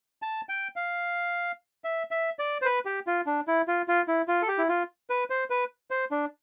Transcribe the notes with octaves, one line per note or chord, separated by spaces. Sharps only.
A5
G5
F5
E5
E5
D5
C5
B4
G4
F4
D4
E4
F4
F4
E4
F4
A4
G4
E4
F4
B4
C5
B4
C5
D4